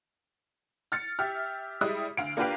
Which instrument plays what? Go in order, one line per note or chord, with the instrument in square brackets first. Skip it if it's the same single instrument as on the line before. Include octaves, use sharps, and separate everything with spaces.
[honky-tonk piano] F6 A6 C#7
G4 E5 F6
G3 G#3 E4 D#6
D2 F5 D7
A#3 D4 F4 G4 B4 F5